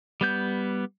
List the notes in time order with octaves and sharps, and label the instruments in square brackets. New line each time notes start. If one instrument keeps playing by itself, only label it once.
[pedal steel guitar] G3 B3 G6